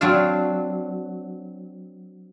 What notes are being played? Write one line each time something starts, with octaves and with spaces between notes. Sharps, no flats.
F#3 C4 D4 D5 F5